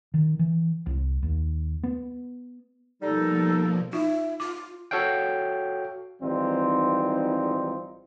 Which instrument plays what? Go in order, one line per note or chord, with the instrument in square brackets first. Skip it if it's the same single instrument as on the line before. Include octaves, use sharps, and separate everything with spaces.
[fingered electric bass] D#3
E3
C2
D#2
B3
[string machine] B2 F3 A#3 [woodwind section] G3 D#4 [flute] A4
[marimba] D#4 F4 [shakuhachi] E5
[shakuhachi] F4 [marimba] D6
[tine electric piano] F#4 A4 C#5 F5 G5
[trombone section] G#1 E3 G3 C4 D#4 F4